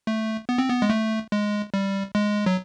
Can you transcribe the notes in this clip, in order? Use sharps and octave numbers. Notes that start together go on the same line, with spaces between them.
A3
B3
C4
B3
G#3
A3
G#3
G3
G#3
F#3